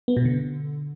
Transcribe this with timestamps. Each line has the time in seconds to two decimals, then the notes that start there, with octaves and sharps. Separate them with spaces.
0.08 B3
0.17 B2
0.25 D3